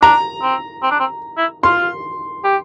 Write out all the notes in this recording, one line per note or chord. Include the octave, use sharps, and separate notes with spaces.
D4 A#5
C4
C4
D4
C4
E4
F4 C6
G4